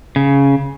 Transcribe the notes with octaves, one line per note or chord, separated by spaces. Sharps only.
C#3